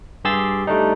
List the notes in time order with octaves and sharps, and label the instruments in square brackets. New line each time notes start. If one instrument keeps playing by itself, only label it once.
[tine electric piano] G2 G4 G#4 C6 E6 A6
G3 A3 D4 D#4